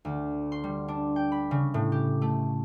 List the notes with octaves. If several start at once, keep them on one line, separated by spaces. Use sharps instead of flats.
D2
C6
G3
D4
G5
B5
C#3
A2
G4
A3